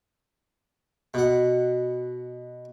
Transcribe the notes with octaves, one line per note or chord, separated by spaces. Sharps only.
B2 F#5